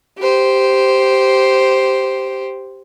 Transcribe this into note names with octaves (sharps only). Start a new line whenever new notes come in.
G4 C5